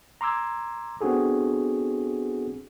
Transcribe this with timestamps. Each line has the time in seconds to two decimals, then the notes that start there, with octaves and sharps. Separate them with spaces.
0.21 A#5 C6 D6 E6 G#6
1.01 B3 C4 D4 F#4 G#4 A4